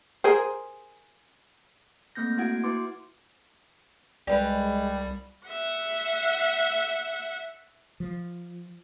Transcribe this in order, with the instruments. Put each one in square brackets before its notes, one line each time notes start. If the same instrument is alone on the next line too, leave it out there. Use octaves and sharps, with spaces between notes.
[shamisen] G#4 A#4 C5
[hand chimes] A3 A#3 C4 G6 A#6
A#3 E4 F#4 F#5 G#6 D7
E4 F#4 B4 C6 D6
[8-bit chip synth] C2 G3 [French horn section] G#3 [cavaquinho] G4 B4 [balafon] D5
[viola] E5 F#5
[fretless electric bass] F3